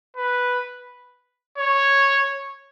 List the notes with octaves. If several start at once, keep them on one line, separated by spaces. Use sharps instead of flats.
B4
C#5